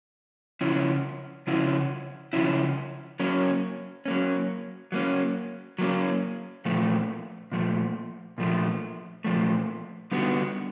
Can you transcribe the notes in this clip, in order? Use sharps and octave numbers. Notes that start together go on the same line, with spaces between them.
C#3 F3 C#4 E4
C#3 F3 C#4 E4
C#3 F3 C#4 E4
F#3 A#3 C#4
F#3 A#3 C#4
F#3 A#3 C#4
F#3 A#3 C#4
A#2 F3 A3
A#2 F3 A3
A#2 F3 A3
A#2 F3 A3
D3 G3 B3 D#4 F#4